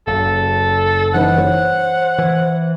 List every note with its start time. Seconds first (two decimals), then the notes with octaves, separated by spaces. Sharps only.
0.07 F#1 A4
1.14 E3 D#4 B4 C5 F#5
1.38 C#5
2.18 E3